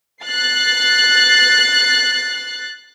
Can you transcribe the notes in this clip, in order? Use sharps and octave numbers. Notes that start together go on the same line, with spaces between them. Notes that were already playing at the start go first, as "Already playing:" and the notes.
F#6 A6 C7